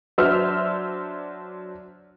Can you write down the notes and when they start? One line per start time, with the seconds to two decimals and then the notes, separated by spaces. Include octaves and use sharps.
0.18 F#3 D4 C5 E5 E6 F6